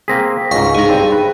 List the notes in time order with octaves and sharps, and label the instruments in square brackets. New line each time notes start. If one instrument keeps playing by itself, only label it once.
[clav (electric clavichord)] A#3 C4 G#4 [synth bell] A#6 B6
[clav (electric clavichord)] C#2 G#2 [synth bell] F5 C#6 A#6
[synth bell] D#4 G#4
[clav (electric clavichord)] G2 C4 A5
B4